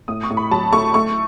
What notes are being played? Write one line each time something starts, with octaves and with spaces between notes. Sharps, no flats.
A2 D#6
C#6
A2
B5
F#3 A5
A3 C#6
A3 C#6